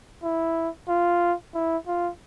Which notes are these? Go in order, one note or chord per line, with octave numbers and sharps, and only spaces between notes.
E4
F4
E4
F4